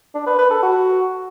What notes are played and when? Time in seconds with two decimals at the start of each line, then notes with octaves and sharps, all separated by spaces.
0.15 D4
0.27 B4
0.39 B4
0.51 A4
0.63 F#4